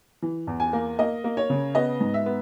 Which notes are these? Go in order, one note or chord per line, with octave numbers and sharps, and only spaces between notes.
E3
E2
G#5
A#3
A#3 D#5
A#3
C#5
C#3
B3 D#5
G#2
E5
B3